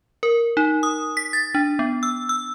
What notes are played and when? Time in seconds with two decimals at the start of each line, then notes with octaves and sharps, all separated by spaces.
0.23 A#4
0.57 D#4
0.83 D#6
1.17 B6
1.33 A6
1.55 D4
1.79 B3
2.03 E6
2.29 E6